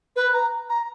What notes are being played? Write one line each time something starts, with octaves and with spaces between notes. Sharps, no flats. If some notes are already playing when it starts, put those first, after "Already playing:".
B4
A#5
A#5